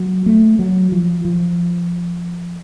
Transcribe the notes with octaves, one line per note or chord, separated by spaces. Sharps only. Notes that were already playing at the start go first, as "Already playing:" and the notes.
Already playing: F#3
A3
F#3
F3
F3